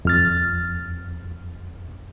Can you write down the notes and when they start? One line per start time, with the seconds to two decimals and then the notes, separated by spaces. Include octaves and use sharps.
0.05 F2 F6 A6